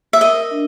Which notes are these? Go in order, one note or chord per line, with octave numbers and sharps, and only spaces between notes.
E5
A#4 D#5
D4